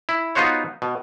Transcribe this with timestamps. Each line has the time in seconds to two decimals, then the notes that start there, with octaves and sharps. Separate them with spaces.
0.09 E4
0.35 B3 D#4 F4 F#4 C5 C#5
0.82 B2